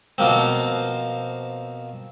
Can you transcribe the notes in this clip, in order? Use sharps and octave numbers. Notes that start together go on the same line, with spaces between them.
B2 F3 A#3 C4